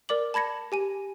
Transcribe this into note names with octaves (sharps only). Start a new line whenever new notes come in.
A#4 D5 D6 F#7
A5 B5 G#6 A#6 C#7
G4 G#5 D#7